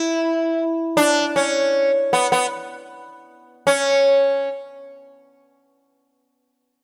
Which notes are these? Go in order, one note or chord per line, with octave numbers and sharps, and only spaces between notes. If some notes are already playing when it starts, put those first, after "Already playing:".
Already playing: E4
D4
C#4
B3
B3
C#4